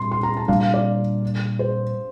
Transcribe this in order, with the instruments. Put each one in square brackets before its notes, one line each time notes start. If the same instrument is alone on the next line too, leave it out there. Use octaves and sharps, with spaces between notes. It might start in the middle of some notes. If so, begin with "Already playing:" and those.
Already playing: [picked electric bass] A#2 G3 [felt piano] C6
[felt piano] C6
A#5
A5
[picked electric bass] A#2 G3 D4 [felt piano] F5
[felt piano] F5
D5
C5